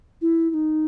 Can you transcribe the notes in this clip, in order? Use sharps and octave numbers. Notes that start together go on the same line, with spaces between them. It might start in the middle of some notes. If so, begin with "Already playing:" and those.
E4
E4
D#4